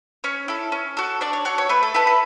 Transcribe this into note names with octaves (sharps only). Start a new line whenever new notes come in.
C#4 C#5
E4 A4
C#4
F#4 A4
D4 D5
C#5
F#4 A4 C#5
C#5
A3 B4
A4
E4 A4 B4
B4